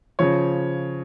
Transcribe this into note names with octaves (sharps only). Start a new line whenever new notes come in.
C#3 F3 C#5